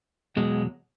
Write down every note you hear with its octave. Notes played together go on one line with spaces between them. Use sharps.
E2 B2 F#3 G#3